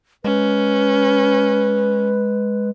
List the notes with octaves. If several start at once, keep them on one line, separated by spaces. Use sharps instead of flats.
G#3 C#4 B4